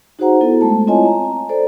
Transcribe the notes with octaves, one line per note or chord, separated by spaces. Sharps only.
D#4 F#4 G#4 C5 F#5 A#5
B3 E4 A4
G#3 A3 A5
C4 E4 F4 C#5 D#5 G#5
A#5
A4 C5 D5